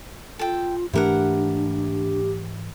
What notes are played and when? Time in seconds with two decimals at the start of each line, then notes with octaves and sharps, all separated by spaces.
0.39 F4 A4 G5
0.93 G#2 E3 A3 D4 E4 G4 A#4 F#5